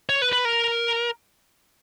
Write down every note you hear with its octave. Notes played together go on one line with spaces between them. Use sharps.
C#5
B4
B4
A#4